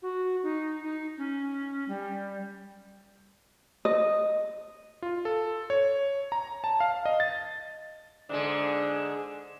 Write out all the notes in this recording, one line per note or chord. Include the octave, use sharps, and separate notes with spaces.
F#4
D#4
D#4
C#4
G3
D#5
F4
A4
C#5
A#5
A5
F5
D#5
A6
G#2 D3 G#3 D4